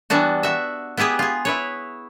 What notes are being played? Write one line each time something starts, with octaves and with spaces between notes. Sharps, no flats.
E3 G3 B3 D4 F#4
F#4 E5
B3 E4 G4 G#4 B4
F4 G#4
E4 B4 C#5